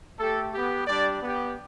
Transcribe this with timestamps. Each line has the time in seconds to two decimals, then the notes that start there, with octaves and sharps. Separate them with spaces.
0.19 A3 G4 A4
0.53 B3 G4
0.87 G3 D4 G4 D5
1.21 B3 G4